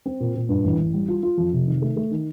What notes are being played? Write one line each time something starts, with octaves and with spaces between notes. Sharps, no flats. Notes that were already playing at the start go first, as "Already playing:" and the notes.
C4
A#2
A#2
G2
A1
A1
G3
F4
F4
F2
C3
D#3
A3
A3
D#3